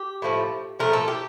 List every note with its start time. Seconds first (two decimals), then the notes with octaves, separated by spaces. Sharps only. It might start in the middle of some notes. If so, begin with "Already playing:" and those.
Already playing: G4
0.22 A2 F3 A3
0.79 A2 F3 A3 A#4
0.93 A4
1.08 G4